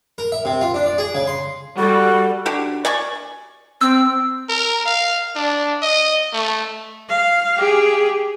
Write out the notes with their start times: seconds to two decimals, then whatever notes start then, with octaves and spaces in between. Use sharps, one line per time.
0.18 A#4
0.32 E5
0.45 C3
0.61 F4
0.74 D4
0.86 D5
0.98 G#4
1.15 C#3
1.27 C6
1.78 G3 F#4 A4
2.46 D3 F#4 G4
2.85 D5 G#5 C#6
3.81 C4 E6
4.49 A#4
4.86 F5
5.35 D4
5.82 D#5
6.33 A3
7.09 F5
7.57 G4 G#4